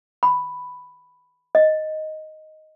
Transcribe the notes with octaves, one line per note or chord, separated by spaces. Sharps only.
B5
D#5